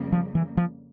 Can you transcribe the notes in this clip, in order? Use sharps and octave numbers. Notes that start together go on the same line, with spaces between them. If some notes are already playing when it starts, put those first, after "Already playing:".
Already playing: F2 C#3 G3 A#3
F3
E3
F3